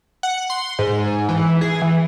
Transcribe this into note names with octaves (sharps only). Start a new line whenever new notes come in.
F#5
C6
G#2
E3
G#4
E3